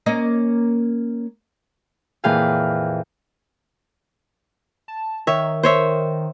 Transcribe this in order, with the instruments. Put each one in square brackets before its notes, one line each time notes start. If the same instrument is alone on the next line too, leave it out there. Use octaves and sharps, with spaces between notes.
[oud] A#3 C#4 D#5
[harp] F2 A#2 E3 G#4 F5 G5
[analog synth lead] A5
[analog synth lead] D#3 [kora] C#5 E5
[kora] C5 C#5 E5